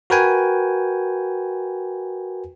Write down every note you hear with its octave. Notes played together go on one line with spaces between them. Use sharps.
F#4 A#4 B4 G5 G#5